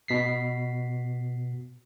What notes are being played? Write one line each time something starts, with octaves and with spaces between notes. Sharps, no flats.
B2 B6 C7